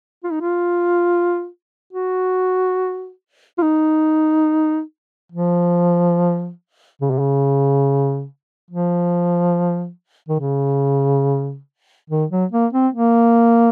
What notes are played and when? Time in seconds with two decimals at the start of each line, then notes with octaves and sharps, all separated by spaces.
0.24 F4
0.32 D#4
0.41 F4
1.93 F#4
3.58 F4
3.62 D#4
5.32 F3
7.01 C#3
7.10 C3
7.19 C#3
8.71 F3
10.29 D#3
10.40 C#3
12.10 D#3
12.31 F#3
12.52 A#3
12.73 C4
12.94 A#3